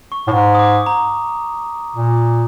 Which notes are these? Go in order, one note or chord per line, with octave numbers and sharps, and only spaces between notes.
C#6
A2
G#2 C#6
D#6
D6
A#5
A#2